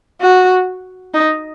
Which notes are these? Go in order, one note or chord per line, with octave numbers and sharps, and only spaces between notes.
F#4
D#4